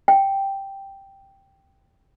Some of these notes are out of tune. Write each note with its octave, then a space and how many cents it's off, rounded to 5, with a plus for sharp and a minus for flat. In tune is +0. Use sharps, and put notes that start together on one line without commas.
G5 +0